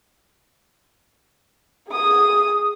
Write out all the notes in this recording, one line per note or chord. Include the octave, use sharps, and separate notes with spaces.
G#4 D#6